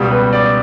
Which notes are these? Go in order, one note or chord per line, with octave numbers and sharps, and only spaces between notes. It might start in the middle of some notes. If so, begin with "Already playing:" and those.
Already playing: C#2 B2 G3
B4
D5